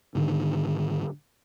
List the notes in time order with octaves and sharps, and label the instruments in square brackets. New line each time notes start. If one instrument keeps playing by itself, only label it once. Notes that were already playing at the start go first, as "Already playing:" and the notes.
[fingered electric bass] G#2 D3 D#3